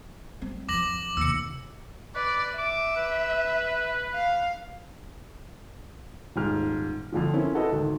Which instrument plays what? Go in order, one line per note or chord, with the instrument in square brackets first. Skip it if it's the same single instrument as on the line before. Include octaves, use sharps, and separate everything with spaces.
[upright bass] G3 C4
[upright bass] F2 F3 [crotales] D6 A#6 F#7
[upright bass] D#2 C3 [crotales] E6 C#7
[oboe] B4 [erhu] D5
[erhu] E5 [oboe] D6
[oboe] B4
[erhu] F5
[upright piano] D#1 G#2 F6
F2 D3 F3
C4 C#4 E4 A#4
E4 F#4 A4 B4 D#5
G#1 D2 D#3